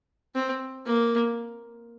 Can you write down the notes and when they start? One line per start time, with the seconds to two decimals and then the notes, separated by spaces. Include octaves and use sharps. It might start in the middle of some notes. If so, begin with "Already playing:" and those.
0.35 C4
0.86 A#3